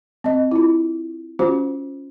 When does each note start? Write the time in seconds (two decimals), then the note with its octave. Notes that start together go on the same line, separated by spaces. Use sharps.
0.24 C4 D#5
0.51 E4 F4
1.39 C#4 F4 F#4 C5